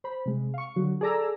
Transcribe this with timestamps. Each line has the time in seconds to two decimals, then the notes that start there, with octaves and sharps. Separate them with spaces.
0.04 C5 B5
0.26 C3 G#3
0.54 F5 C#6
0.76 D3 F#3 F#4
1.01 G#4 A4 D5 A5 A#5 E6